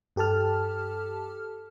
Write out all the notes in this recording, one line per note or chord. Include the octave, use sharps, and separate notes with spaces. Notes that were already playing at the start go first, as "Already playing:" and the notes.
G2 G4 A4 A5 F6